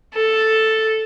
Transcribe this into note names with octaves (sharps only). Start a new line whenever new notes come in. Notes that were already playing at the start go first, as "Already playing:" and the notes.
A4